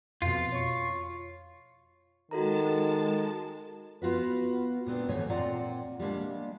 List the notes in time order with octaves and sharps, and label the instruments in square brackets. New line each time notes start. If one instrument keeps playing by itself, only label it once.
[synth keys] F2 B2 [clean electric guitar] F4
[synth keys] C#5 C#6
[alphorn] D#3 [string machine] G#3 A5 [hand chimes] F#4 A4 A#5
[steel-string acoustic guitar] B3 F4 F#4 B4
A#2 B3 C4 D4
D#2 G#2 B2 E3 A3 C#5
A#2 C4 F4 D5 F#5 A#5
G3 G#3 A#3 D4